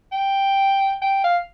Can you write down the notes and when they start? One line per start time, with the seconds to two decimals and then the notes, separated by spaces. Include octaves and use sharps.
0.12 G5
1.02 G5
1.24 F5